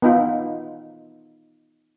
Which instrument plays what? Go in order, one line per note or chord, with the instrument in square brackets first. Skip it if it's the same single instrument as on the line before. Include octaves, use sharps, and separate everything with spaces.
[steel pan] B3 D#4 F4